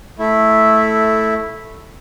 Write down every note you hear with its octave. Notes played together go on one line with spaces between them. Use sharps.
A3 E4